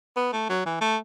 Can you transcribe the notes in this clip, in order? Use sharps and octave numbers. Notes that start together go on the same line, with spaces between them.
B3
A3
F#3
E3
A3